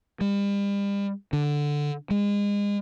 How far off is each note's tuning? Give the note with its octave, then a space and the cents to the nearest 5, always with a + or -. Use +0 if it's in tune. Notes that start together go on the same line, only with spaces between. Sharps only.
G3 +40
D3 +0
G#3 -30